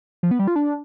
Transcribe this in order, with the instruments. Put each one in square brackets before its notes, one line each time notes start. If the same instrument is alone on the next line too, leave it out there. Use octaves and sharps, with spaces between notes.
[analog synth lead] F3
B3
G3
F4
D4